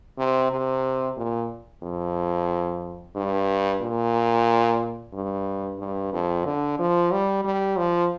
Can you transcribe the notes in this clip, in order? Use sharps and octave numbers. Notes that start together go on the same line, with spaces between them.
C3
C3
A#2
F2
G2
A#2
G2
G2
F2
D3
F3
G3
G3
F3